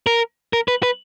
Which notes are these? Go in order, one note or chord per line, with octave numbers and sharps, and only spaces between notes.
A#4
A#4
B4
B4